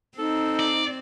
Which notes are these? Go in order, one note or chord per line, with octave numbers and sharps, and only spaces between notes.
C4 D#4 A4
D5